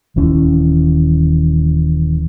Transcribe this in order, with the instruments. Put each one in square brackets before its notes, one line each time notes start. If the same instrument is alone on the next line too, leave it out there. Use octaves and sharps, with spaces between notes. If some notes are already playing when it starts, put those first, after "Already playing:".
[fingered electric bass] D#1 D#2 E3 C#4